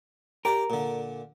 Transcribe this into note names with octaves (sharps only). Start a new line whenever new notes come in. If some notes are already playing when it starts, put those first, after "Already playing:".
G4 A#4 D5 G5
A#2 D3